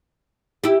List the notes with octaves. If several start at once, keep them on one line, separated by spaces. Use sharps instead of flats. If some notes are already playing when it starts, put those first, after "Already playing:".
E4 G4